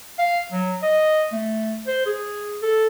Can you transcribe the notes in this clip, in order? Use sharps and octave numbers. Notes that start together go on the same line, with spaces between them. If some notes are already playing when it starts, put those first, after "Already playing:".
F5
F#3
D#5
A3
C5
G#4
A4